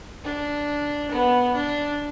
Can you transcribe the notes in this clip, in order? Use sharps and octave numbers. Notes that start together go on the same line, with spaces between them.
D4
B3
D4